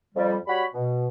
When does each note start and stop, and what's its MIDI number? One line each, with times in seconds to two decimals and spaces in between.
0.14 0.36 41
0.14 0.36 55
0.47 0.63 55
0.47 0.63 66
0.47 0.63 73
0.47 0.63 83
0.74 1.07 47